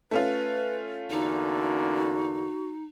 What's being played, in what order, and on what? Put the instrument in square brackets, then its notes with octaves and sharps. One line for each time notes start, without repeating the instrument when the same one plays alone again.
[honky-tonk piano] A3 C#4 F4 [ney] B4
[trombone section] E2 D3 A#3 [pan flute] D#4 [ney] F#4